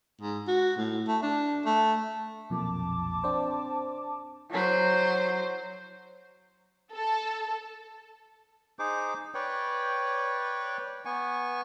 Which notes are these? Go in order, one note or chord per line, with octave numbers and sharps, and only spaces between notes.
G#2
F#4
A2
A3
D4
A3
B1 F2 A#2 A5 D6
C4 D4 C5
F#3 C5
A4
D#4 G#4 C5 D6
B4 C#5 D5 G5
B3 G#5 C#6